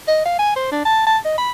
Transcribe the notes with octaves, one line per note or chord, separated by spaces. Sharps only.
D#5
F5
G#5
C5
D4
A5
A5
D#5
B5